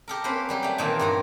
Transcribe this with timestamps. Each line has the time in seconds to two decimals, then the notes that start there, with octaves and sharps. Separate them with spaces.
0.08 G4 A4 A#4
0.24 A#3 C4 C#4 B4
0.49 F#3 G3 G4
0.63 A3 G5
0.78 A#2 D#3 E3 A#3 G5 A5
0.99 G2 F#4 A#5